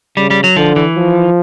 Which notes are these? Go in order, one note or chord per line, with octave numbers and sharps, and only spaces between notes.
C#3 G3
G3
F#3
D3 F3
E3
F3